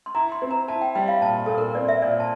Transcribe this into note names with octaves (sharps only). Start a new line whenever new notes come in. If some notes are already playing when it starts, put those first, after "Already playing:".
C6
E4 A#5
C6
C4
A#5
E4 A5
G5
G3 G5
F5
A#2 A5
A#2 A4
A#4
C4 D5
E5
A#2 D5
A5